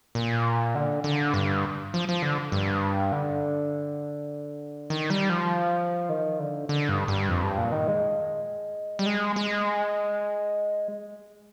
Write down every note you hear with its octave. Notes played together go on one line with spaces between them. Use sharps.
A#2
D3
D3
G2
F3
F3
D3
G2
D3
D#3
G3
F3
D#3
D3
D3
G2
G2
F2
G2
A#2
D#3
G#3
G3
G#3
G#3